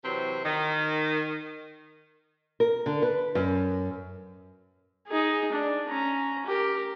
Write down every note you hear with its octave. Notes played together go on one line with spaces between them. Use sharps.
C3 E3 F#3 C4
D#3
A#4
D3
B4
F#2
D#4 G#4
D4
C#4 A#5
G4 A#4